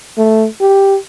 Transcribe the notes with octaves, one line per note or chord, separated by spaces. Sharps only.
A3
G4